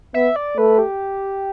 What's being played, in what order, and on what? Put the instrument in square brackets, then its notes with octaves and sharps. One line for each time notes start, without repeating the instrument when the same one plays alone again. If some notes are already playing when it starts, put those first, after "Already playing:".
[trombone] B3 [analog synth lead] E5
[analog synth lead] D5
[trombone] A3 [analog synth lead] B4
[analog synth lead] G4